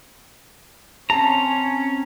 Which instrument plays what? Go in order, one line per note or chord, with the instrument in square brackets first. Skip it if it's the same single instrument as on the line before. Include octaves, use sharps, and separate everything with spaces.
[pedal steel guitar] C4 A#5 [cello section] C#4 [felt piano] A5